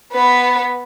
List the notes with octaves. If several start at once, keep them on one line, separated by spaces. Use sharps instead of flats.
B3 B4